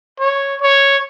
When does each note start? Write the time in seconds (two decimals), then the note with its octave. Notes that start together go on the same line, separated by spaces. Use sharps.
0.20 C#5
0.61 C#5